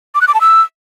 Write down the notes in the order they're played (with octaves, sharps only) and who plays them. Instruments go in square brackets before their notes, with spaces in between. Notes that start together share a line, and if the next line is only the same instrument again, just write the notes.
[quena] D6
F#6
D6
A5
E6